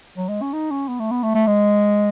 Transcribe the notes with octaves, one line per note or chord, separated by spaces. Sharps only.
F#3
G#3
C#4
D#4
C#4
B3
A3
B3
A3
A3
G#3